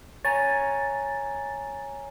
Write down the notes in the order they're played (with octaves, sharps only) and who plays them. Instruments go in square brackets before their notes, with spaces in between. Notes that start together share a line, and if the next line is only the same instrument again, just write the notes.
[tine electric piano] C#5 G#5 A#5 [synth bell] A6